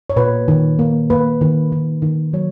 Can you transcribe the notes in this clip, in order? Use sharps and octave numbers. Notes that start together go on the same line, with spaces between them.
C#5
A#2 B4
D#3
A#3
A#3 B4
D#3
D#3
D#3
F#3 C#5